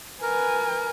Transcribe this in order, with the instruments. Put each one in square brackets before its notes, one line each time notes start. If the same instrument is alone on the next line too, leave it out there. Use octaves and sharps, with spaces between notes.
[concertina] A#4 [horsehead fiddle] B4 G#5